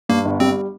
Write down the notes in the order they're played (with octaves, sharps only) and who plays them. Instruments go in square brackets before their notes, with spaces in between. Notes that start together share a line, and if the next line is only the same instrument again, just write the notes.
[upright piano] G2 [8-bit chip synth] A#3
[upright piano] G1
[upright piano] G3 [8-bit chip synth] C4